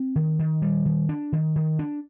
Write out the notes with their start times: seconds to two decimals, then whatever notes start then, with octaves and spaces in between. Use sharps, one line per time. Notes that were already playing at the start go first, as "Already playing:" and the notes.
Already playing: C4
0.16 D#3
0.39 D#3
0.62 G3
0.85 D#3
1.09 D4
1.32 D#3
1.56 D#3
1.79 D4